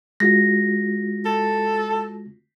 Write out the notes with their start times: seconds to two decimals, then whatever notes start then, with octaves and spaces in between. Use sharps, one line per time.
0.20 G#3 F4 F#4 A#6
1.26 A4